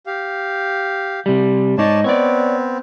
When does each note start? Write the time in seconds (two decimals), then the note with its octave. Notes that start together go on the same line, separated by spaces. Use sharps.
0.07 G4 F5
1.26 C3 G3
1.78 G#2 D#4 C#5 D5 A5
2.04 B3 C4 C#5 D5